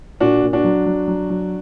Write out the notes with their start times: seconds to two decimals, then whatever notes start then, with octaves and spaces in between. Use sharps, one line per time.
0.20 A#2 D4 F#4
0.43 A#2
0.53 D4 F#4
0.64 F#3
0.86 F#3
1.08 F#3
1.30 F#3